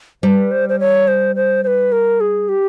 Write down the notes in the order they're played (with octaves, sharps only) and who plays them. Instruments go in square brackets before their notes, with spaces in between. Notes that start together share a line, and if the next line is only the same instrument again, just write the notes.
[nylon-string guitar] G3 [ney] B4 C5
[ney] C5
C5
C#5
C5
C5
C5
B4
A#4
G#4
G4